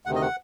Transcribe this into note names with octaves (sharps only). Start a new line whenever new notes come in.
D2 C3 D#3 F#5
D#5
F#5